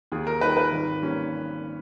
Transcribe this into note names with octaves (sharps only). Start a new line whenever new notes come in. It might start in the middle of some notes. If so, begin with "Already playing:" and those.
D#2 G#4
A#4
D#3 G3 B4
B4
G#1
G3 A#3 C#4